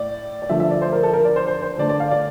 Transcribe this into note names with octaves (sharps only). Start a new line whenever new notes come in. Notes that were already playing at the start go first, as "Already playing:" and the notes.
Already playing: A2 D5
D5
D3 F3 A3 E5
E5
D5
C5
A#4
A4
A#4
D5
C5
C5
C5
D3 A3 D5
D5
F5
D5